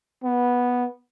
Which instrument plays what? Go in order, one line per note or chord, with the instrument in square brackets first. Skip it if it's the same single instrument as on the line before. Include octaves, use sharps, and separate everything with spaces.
[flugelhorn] B3